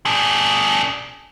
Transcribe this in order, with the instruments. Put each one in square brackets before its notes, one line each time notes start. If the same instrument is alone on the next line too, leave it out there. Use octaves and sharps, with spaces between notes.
[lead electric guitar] D4 G#4